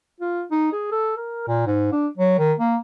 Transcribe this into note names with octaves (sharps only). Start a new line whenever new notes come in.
F4
D#4
G#4
A4
A#4
A#2
G#2
D4
F#3
D#3
A#3